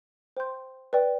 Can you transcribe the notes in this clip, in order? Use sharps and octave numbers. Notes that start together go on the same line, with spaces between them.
C5 G5 C6 G6
B4 D5 G5